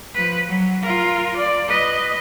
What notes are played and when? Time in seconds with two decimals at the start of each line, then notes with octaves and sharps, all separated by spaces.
0.15 F3 B4
0.48 F#3
0.83 F4 A#4
1.37 D5
1.68 B4 D#5